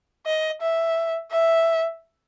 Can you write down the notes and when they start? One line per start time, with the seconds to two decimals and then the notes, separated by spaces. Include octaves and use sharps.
0.26 D#5
0.61 E5
1.31 E5